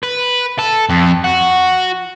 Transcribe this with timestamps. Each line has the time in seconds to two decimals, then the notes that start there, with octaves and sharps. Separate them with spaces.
0.03 B4
0.59 A4
0.90 F2
1.24 F#4